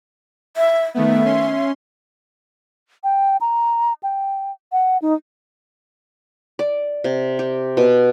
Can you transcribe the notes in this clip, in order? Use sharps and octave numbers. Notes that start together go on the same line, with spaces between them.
E5
D#3 A3 B3 E5
C#4 C6
G5
A#5
G5
F#5
D#4
D5
C3
G4
B2